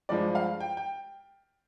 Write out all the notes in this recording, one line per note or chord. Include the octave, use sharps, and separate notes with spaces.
G2 F3 G#3 D5
F5
G5
G5